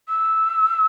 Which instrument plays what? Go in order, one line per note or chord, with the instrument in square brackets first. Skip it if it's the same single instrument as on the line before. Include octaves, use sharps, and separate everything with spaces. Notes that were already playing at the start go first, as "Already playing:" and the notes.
[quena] E6